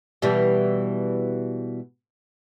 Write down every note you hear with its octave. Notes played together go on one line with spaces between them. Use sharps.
B2 E3 G3